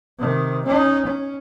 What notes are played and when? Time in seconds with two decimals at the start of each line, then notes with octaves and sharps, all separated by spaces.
0.19 C3 D#3
0.65 C#4 D#4
1.06 C#4